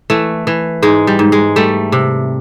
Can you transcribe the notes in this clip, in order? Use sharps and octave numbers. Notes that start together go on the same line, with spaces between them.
E3 A3
E3
G#2 G#3
G3
G#2
G#3
G3 A3
C3